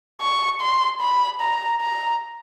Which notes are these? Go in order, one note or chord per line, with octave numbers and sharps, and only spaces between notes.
C#6
C6
B5
A#5
A#5